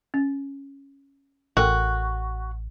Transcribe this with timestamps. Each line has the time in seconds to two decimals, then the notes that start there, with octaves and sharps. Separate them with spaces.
0.14 C#4
1.57 A1 F#4 A4 A#4 G5